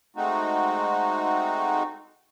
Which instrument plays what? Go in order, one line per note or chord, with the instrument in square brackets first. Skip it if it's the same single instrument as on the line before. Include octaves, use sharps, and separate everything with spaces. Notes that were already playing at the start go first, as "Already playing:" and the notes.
[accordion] G#3 A3 C4 D#4 F#4